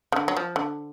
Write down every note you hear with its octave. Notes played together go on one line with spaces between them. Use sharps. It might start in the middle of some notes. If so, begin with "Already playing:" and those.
C#3
D3
F#3
F3
D3